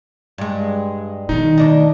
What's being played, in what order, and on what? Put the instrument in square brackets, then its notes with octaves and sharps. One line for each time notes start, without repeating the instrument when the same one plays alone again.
[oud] G2 G#3
[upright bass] B2 D#3 [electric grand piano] D#4
[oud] D2 D4 D#5